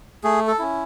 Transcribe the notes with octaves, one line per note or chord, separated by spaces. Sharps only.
A3 G#4
A4
C#4 E4